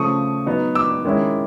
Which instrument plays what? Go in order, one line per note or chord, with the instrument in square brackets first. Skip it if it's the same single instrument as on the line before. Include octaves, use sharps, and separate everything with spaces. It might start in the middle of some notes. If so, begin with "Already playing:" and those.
Already playing: [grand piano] C#3 F3 A3 C#6 D#6
F#3 B3 D#4
D6 E6
D#3 G#3 C#4 E4